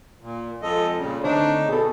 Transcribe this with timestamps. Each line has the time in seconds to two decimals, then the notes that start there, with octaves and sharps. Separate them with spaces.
0.22 A#2
0.62 F2 G#3 A4 D#5
0.99 A#2 C#3 G3
1.24 D3 A3 C4 D4 D#4 C#5
1.69 B2 G#4 A4